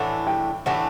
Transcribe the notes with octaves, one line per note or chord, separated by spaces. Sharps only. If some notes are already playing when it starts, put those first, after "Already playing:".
Already playing: A2 E3 A3 D4 F#5
G5
A2 E3 A3 D4 F#5